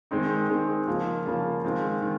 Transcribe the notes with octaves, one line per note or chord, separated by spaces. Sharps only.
D#3 G#3 C4 D#4
D#3 G#3 C4 D#4
C#3 F3 A#3 F4
C#3 F3 A#3 F4
D#3 G#3 C4 F4
D#3